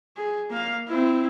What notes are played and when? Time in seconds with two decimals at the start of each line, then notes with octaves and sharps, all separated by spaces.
0.17 G#4
0.50 A#3 F5
0.88 C4 E4